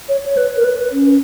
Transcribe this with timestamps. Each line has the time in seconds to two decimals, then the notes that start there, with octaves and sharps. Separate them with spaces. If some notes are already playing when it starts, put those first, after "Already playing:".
0.09 C#5
0.25 C#5
0.37 B4
0.57 A#4
0.64 B4
0.92 C#4